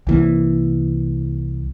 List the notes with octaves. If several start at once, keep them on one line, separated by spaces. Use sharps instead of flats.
C2 E3 A#3